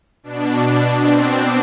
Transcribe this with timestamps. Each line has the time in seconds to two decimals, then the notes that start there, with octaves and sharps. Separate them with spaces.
0.23 B2 D4
0.61 D4
1.00 C4